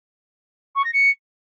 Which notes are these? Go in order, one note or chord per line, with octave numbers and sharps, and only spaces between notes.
C#6
A#6
C#7